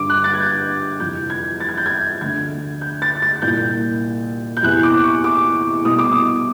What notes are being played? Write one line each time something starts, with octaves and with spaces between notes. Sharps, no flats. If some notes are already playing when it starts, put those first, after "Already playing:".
Already playing: G2 D3 D6
F#6
A6
G#6
G6
F2 C3 E3 G6
G#6
A6
G#6
G6
G#6
D2 D3 G#6
G6
A6
A6
C2 A#2 G6
G6
E2 C3 E3 F#6
D6
C#6
D6
C2 B2 D#6
D6
D#6